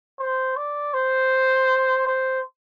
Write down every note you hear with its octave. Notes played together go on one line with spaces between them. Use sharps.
C5
D5
C5
C5